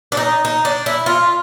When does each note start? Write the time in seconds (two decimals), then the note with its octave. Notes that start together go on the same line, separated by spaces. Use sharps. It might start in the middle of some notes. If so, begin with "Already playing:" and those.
0.12 D4
0.17 D#4
0.45 D#4
0.65 D4
0.86 E4
1.06 F4